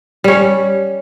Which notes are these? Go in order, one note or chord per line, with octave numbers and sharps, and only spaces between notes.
G3 C#4